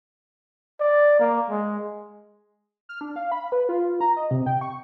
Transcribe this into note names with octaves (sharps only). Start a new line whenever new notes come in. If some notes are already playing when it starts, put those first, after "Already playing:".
D5
A#3
G#3
F6
D4
F5
B5
B4
F4
A#5
D#5
C3
G5
C#6